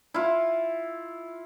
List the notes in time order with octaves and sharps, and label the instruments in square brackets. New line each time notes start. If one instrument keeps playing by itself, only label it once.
[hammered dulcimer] E4 F4